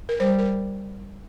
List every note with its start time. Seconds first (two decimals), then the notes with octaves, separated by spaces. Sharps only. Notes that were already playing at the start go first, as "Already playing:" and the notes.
0.09 A#4
0.19 G3 C5
0.39 A#4